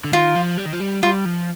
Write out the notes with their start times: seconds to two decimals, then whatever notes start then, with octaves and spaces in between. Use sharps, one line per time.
0.04 D3
0.13 D#3 F4
0.35 F3
0.58 G3
0.66 D#3
0.73 F3
0.81 G3
1.03 G3 F4
1.26 F3